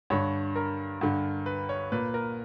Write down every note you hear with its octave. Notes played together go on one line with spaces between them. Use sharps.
G2 D3 C#5
A#4
G2 D3
B4
C#5
A#2 B4
A#4